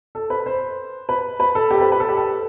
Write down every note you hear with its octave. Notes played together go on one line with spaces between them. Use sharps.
A4
B4
C5
B4
B4
A4
G4
A4
B4
B4
A4
G4
A4